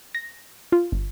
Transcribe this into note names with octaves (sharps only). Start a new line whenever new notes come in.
A#6
F4
G1